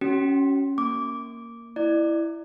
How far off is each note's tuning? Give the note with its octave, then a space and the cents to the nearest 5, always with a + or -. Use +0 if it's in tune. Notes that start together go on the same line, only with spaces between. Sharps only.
C#4 +0 F#4 +35
A#3 -5 D6 -10
E4 +0 D5 +25